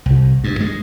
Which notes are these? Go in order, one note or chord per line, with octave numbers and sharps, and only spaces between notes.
C2
G2
G#3